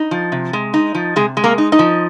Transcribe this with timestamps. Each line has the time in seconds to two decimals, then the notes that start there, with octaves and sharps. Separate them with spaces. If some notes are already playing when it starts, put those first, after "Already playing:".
Already playing: D#4
0.11 F3
0.32 C3
0.53 G#3
0.74 D#4
0.95 F3
1.16 C3 G#3 G#4
1.37 G#3
1.44 A#3 A#4
1.58 D#4
1.72 D#4 D#5
1.79 F3